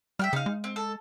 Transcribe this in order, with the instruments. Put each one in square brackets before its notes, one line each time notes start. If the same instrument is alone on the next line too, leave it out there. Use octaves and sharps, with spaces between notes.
[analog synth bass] G3 [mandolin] E5 G5 F6
[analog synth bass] C#3 [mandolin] D#4 F5
[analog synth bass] G#3
[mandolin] C4
A4